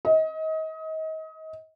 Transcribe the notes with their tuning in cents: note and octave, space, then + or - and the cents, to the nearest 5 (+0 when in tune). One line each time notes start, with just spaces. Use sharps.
D#5 +30